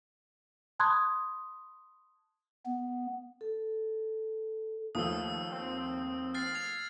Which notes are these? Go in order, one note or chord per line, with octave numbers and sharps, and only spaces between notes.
A5 B5 C6 D#6 F#6 G#6
B3
A4
D#2 F3 A3 D#6 E6
C4
F6 A6 C7
G#6 C7 F7